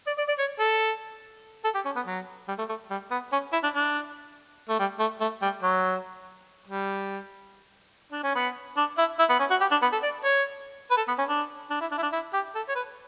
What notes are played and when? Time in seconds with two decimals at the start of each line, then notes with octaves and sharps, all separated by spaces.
0.07 D5
0.18 D5
0.28 D5
0.38 C#5
0.59 A4
1.64 A4
1.75 G4
1.85 C#4
1.96 B3
2.06 F#3
2.48 G3
2.58 A3
2.69 A3
2.90 G3
3.11 B3
3.32 C#4
3.53 E4
3.63 D4
3.74 D4
4.69 A3
4.79 G3
4.99 A3
5.21 A3
5.42 G3
5.63 F#3
6.67 G3
8.12 D4
8.23 C#4
8.35 B3
8.77 D4
8.98 E4
9.19 E4
9.29 B3
9.39 C#4
9.50 F#4
9.61 G4
9.71 D4
9.82 B3
9.93 A4
10.03 D5
10.24 C#5
10.91 B4
10.97 A4
11.08 B3
11.18 C#4
11.29 D4
11.71 D4
11.81 E4
11.91 D4
11.98 E4
12.02 D4
12.12 E4
12.33 G4
12.55 A4
12.68 C#5
12.75 B4